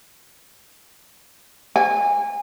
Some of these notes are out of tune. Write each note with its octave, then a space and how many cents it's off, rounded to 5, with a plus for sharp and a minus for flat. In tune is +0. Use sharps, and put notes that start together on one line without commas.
G#5 -25